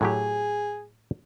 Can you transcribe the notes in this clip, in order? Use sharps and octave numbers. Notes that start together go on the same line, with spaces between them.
A2 F#3 G4 G#4